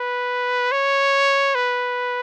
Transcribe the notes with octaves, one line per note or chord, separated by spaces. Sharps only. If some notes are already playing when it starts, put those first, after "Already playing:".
Already playing: B4
C#5
B4